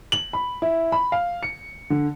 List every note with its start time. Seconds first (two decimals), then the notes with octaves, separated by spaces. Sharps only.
0.12 F#7
0.33 B5
0.62 E4
0.92 B5
1.12 F5
1.43 C#7
1.90 D3